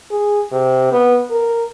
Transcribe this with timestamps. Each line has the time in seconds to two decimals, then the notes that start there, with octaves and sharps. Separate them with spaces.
0.11 G#4
0.52 C3
0.92 B3
1.30 A#4